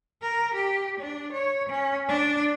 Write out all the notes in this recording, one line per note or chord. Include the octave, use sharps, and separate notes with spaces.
A#4
G4
D4
C#5
C#4
D4